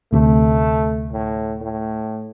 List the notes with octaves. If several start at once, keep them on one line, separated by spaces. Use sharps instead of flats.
D2 C3 A3
A2
A2